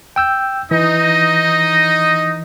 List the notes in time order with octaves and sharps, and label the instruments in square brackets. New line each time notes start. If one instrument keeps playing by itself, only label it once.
[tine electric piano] G5 E6 G6
[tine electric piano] E3 [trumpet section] D#4 D#5